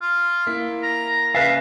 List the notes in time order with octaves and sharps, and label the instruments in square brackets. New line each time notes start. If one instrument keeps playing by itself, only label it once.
[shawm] F4
[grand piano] A#3 E4 B6
[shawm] A#5
[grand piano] C#3 G#5 A6 [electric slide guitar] B4 E5 F5